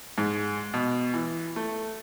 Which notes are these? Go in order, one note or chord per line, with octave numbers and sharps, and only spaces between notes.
G#2
B2
E3
A3